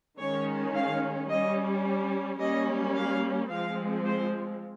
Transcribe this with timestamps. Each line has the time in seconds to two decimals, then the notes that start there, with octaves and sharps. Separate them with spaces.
0.19 D#3 G#3 C#4 C#5
0.75 F5
1.30 G3 C#4 D#5
2.40 G3 A#3 C#4 D#5
2.96 F5
3.51 F3 G#3 C4 F5
4.06 C5